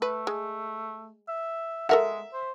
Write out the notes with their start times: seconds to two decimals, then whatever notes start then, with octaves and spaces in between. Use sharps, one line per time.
0.02 A3 B4
0.27 G#3
1.28 E5
1.89 G#3 A4 A#4 E5 F#5
2.33 C5